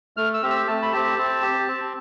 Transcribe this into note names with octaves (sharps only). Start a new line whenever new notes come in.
A3 F6
E6
C4 G4
E6
A3 A5
B5
C4 G4 A5
C4
G4
C4